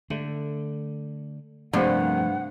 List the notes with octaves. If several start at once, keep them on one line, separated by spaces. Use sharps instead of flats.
D3 A3
G2 C3 F3 A3 A#3 C4 F#5